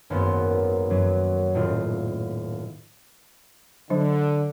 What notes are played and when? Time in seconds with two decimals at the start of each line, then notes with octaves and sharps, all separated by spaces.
0.10 G#1 F#2 A#3 B3 C6
0.90 F#2 F#3
1.54 D#1 A2 F4
3.90 D3 F#3 D4 C5